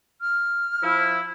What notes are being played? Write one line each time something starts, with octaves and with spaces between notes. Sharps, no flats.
F6
F3 E4